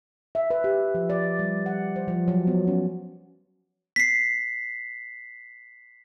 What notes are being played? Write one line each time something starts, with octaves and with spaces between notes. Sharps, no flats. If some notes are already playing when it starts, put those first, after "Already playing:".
E5
B4
G4
F3
D5
G3
F#5
C5
F3
F#3
B3
C#4
B6 C7